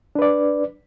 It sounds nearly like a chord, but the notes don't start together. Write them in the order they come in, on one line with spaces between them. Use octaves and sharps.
D4 B4 D5